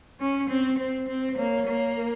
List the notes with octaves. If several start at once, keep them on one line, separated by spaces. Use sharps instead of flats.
C#4
C4
C4 C5
C4
A#3 C#5
A#3
A#4